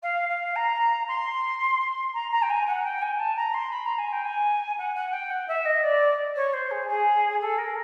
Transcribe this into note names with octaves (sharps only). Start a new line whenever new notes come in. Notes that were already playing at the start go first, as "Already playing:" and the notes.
F5
F5
A#5
C6
A#5
A#5
G5
G#5
F#5
G5
G#5
A5
A#5
C6
B5
A#5
G#5
G5
G#5
F#5
F#5
G5
F#5
E5
D#5
D5
C#5
C5
G#4
G#4
A4
A#4